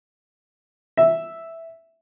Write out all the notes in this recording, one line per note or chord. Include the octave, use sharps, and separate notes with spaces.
E5